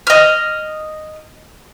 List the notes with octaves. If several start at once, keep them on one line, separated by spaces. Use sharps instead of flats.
D#5 F6